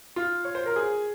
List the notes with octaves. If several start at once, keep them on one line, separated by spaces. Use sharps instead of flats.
F4
C#5
C5
A#4
G#4